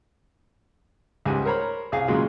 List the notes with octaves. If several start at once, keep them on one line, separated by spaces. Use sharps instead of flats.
C#2 G#2 G3 G#5
A#4 C5 C#5 A#5 B5
C2 G#4 F5
A#2 C#3 F#3 G#3 F4